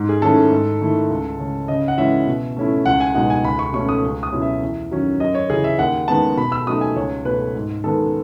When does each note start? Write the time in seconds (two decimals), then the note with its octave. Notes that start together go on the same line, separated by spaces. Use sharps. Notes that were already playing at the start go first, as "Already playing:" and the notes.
Already playing: G#2
0.09 G#4
0.22 D#3 A3 C#4 E4 A4
0.52 G#2
0.81 D#3 A3 E4
1.10 C#2
1.39 C#3 G#3 C#4
1.68 C#3 D#5
1.88 F#5
1.98 E3 G#3 C#4 E4 E5
2.27 B2
2.57 A3 C#4 E4
2.86 C#2 F#5
3.00 G#5
3.15 B2 G#3 D#4 F#5
3.30 G#5
3.44 C#2 B5
3.59 C#6
3.73 B2 A3 C#4 C#6
3.89 D#6
4.03 C#2
4.23 D#6
4.32 B2 F#3 C#4 E4
4.42 E5
4.62 E2
4.91 D#3 F#3 C#4
5.20 F#2 D#5
5.35 C#5
5.50 C#3 E3 G#4
5.64 E5
5.79 D#2 F#5
6.08 D#3 G#3 B3 A5
6.37 B2 B5
6.52 E6
6.67 F#3 A3 D#4 D#6
6.81 G#5
6.96 C#2 C#5
7.25 B2 A3 B4
7.55 G#2
7.84 D#3 G#3 B3 A4